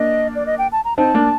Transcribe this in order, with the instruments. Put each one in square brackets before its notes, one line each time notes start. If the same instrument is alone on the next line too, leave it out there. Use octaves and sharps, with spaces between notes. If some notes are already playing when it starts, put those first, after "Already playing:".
Already playing: [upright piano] A#3 D4 [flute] D#5
[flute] D5
D#5
G5
A5
A#5
[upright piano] C4 D#4 [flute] A5
[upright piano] A#3 D4